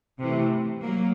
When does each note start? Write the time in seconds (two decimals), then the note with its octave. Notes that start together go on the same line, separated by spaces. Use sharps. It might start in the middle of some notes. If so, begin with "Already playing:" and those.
0.20 C3 E3 A3
0.82 F#3 A#3